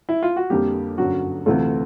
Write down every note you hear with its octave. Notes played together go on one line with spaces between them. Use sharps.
E4
F4
F#4
F2 D3 G3 A#3 G4
G1 F#2 D3 F#3 F#4
D2 C3 E3 A3 F4